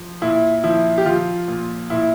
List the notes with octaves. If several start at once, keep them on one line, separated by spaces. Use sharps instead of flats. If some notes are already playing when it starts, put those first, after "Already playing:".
Already playing: F3
A#2 E4
F3 E4
G4
F3 F4
A#2
A#2 E4